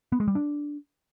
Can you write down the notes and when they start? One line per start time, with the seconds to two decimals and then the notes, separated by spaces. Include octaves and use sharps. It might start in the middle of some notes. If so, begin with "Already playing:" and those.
0.12 B3
0.20 G#3
0.28 G3
0.35 D4